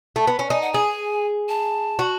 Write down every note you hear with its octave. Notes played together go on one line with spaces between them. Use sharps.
A3
B3
C#4
D#4 G#5
F#5
G#4 G#5
A5
F#4